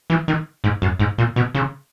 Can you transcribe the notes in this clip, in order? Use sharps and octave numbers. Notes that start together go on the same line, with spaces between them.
E3
D#3
G#2
F#2
G#2
A#2
B2
C#3